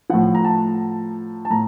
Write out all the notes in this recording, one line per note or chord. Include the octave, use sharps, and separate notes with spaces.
A2 F3 F#5
A#5
A5
A5
A2 A#5